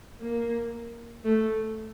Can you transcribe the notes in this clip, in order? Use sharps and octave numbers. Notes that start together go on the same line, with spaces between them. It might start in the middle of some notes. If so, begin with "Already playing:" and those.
A#3
A3